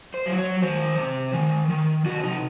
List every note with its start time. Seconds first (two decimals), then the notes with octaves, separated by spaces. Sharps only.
0.14 C5
0.26 F#3
0.38 C#5
0.62 D#3 C5
0.98 C3
1.33 D#3
1.70 D#3
2.05 C3 F#4
2.24 D#4